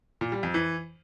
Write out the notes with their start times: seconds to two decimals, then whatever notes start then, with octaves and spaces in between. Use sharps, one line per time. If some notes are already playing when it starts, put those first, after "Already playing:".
0.21 A#2
0.32 G3
0.43 F2
0.54 E3